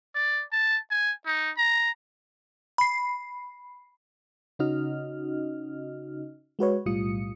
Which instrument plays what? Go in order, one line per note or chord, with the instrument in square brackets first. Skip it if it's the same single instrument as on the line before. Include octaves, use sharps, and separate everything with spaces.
[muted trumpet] D5
A5
G#5
D#4
A#5
[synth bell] B5 C7
[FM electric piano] C#3 C#4 D#4 F#4 D#5 F6
G#3 F#4 B4 C#5
B1 A2 G3 F4 D#6 C#7